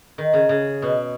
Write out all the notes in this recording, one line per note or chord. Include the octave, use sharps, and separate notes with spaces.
D#3
C#3
C#3
B2